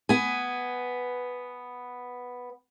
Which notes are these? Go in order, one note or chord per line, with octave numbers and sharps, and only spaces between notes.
B3 G#5